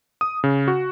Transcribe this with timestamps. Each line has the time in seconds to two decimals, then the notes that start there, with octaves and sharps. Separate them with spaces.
0.21 D#6
0.44 C#3
0.68 F#4